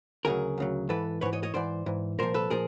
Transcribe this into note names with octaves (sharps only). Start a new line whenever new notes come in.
D2 C#3 F#3 G#4 A#4
D2 C#3 F#3
G#2 E3 A4 B4
G#2 E3 B4 C#5
C#5 D#5
C#5 D#5
G#2 E3 C5 D5
G#2 E3
C2 A#2 F3 A#4 C5
A4 B4
A#2 F3 G#4 A#4